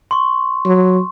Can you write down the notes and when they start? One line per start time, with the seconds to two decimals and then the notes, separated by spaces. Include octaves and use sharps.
0.11 C6 C#6
0.65 F#3